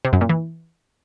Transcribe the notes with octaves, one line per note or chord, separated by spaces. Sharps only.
C3
F#2
A#2
E3